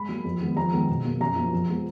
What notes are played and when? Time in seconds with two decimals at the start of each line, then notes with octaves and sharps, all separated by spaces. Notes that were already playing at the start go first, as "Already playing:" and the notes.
Already playing: G#2 B5
0.09 F#3 A#3
0.24 F2
0.41 D#3 G#3 B3
0.56 F2 A#5
0.72 D#3 G#3 B3
0.89 B2
1.05 F#3 A#3
1.21 F#2 A#5
1.36 F3 A#3
1.53 F2
1.69 F3 G#3 B3